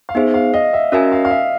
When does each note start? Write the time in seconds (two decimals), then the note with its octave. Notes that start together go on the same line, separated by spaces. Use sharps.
0.09 F5
0.15 B3 D#4 G#4 C5 E5
0.34 F5
0.54 D#5
0.73 E5
0.92 C#4 F#4 A#4 D#5 E5 G#5
1.12 F5
1.25 F5
1.30 E5